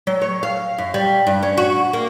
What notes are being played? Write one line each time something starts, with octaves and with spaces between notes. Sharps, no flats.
F#3
C#5
F5
F#2
G3
G2
C#4
F#4
A#3